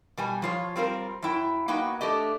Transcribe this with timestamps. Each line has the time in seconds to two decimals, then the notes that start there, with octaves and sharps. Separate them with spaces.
0.17 B2 G3 G#5
0.42 F3 F4 C#5
0.76 G3 C4 F4 A#4
1.22 F#2 E4 G5
1.68 A#3 B3 D#4 F#4 G5
2.01 A3 D4 G4 D#5